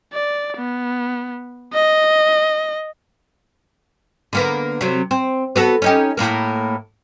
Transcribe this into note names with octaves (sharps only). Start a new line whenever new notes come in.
D5
B3
D#5
D3 A#3 B3
C3 F#3
C4
B3 F#4 A4
C#4 D#4 G4
A2 A#3 A#4